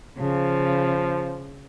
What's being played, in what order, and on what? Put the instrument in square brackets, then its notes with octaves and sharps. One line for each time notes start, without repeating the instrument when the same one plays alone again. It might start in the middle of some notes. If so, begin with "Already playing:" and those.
[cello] C#3 [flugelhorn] F3